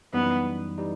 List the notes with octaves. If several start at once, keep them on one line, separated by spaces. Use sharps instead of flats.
F#2 E3 G3 B3 D#4
E3 G3 D#4